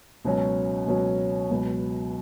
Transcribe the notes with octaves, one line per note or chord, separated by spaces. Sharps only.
C#2 B2 F#3 C#4
C#2 B2 F#3 C#4
C#2 B2 F#3 B3